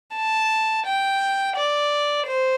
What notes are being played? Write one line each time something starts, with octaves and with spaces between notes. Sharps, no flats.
A5
G5
D5
C5